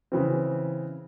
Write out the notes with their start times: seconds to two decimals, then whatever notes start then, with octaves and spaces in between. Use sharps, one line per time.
0.12 C#3 E3 C4